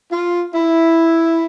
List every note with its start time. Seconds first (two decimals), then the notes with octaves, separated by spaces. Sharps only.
0.11 F4
0.55 E4